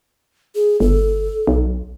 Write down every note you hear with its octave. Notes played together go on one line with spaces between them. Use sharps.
G#4
G1 A4
B1